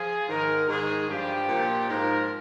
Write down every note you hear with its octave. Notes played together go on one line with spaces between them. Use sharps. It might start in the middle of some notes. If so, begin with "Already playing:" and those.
Already playing: F3 G#4
G#2 D#3 A#4
G#2 D#3 G#4
G2 F3 G4
A#2 F3
G#2 F3 A#4